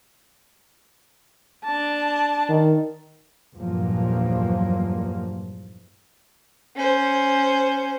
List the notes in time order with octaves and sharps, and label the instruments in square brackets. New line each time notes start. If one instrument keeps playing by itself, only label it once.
[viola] D4 A5
[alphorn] D#3
[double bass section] E2 G2 A#2 F3 F#3 A#3
[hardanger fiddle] C#4 C5